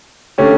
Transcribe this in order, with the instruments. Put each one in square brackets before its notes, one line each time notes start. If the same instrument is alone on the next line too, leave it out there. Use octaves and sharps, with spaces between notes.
[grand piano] D3 A3 C#4 G4